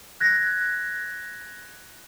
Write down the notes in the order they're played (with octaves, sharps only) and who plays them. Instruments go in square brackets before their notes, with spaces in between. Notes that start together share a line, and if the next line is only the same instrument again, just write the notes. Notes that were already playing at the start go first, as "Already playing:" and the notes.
[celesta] F#6 G#6 A#6